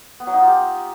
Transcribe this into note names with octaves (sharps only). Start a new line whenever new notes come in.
B3
F#3
D#4
F4
G4